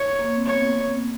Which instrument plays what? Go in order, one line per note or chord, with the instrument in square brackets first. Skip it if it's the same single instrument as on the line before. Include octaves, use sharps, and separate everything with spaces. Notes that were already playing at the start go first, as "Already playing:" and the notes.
Already playing: [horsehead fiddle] C#5
[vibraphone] A#3
C4
[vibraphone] B3 [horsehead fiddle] C#5